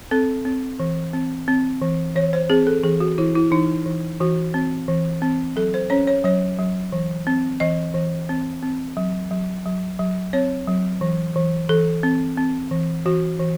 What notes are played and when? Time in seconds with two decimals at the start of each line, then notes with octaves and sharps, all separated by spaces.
0.11 C4 A4
0.45 C4
0.80 E3
1.13 C4
1.48 C4
1.82 E3
2.15 E3 C#5
2.33 C5
2.50 C4 G#4
2.67 A4
2.84 E3 G#4
3.00 F#4
3.18 E3 E4
3.35 E4
3.51 E3 D#4
3.86 E3
4.20 E3 F#4
4.54 C4
4.88 E3
5.22 C4
5.56 F#3 A4
5.74 C5
5.90 C#4 C#5
6.07 C#5
6.24 F#3 C#5
6.59 F#3
6.92 E3
7.27 C4
7.60 E3 D#5
7.94 E3
8.29 C4
8.63 C4
8.97 F#3
9.31 F#3
9.66 F#3
9.99 F#3
10.33 C4 C#5
10.67 F#3
11.01 E3
11.36 E3
11.69 E3 A4
12.03 C4
12.37 C4
12.71 E3
13.06 E3 F#4
13.40 E3